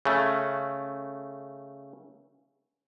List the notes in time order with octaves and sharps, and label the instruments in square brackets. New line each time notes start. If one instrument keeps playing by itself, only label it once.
[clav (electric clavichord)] C#3 A3